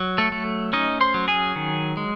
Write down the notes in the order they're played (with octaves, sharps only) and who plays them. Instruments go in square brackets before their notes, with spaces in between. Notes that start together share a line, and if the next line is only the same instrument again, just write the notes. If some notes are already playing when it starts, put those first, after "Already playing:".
Already playing: [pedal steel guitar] F#3
A3 A4
A3
C#4 D#4 D#5
C5 C6
F#3
G#4 G#5
D#3
G#3